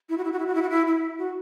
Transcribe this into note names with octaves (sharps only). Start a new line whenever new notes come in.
E4
F#4
E4
F#4
E4
F#4
E4
F#4
E4
E4
F#4